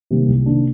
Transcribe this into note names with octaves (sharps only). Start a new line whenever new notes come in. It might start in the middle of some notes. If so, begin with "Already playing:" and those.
C3 D#3 G3 A#3
C2
C3 D#3 A#3 D4